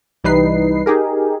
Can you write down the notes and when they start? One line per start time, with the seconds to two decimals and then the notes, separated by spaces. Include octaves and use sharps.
0.24 C2 E3 G3 D#4 B4 C7
0.86 D#4 G4 G#4 A#4